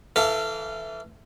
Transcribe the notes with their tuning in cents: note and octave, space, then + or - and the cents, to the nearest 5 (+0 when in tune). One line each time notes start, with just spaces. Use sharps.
E3 +0 A4 +10 F5 -20